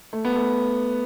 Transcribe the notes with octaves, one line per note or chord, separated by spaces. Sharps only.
A3
B3
A3